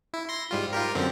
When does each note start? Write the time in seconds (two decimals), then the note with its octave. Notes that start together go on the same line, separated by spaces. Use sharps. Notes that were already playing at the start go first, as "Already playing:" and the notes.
0.14 E4
0.29 C6 A#6
0.51 G#2 G3 F4
0.73 F4 G4 A#4
0.95 F#2 D3 C4